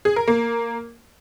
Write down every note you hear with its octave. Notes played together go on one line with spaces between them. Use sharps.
G#4
A#4
A#3